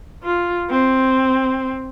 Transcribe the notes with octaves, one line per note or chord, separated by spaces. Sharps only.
F4
C4